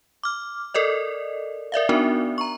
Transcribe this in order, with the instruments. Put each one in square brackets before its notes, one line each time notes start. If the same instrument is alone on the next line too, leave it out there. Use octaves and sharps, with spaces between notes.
[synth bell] D6 F6
A4 A#4 D5 D#5
A#4 D5 E5 F5
B3 D4 D#4 F#4 A#4
A#5 C#6